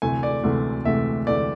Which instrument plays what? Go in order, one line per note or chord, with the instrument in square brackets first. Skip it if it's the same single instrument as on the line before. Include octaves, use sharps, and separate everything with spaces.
[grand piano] D2 C3 E3 A3 G#5
D5
D2 C3 E3 A3
D2 C3 E3 A3 E5
D2 C3 E3 A3 D5